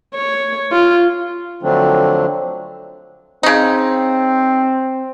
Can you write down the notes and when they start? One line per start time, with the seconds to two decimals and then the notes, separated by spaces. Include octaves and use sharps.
0.15 C#5
0.72 F4
1.63 D3 F3 F#3 A3 C4 D4
3.43 C#3 C4 D#4